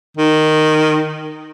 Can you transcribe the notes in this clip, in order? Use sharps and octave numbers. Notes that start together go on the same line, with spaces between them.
D#3